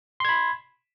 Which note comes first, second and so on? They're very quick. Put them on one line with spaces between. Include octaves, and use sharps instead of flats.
C6 G#6 B5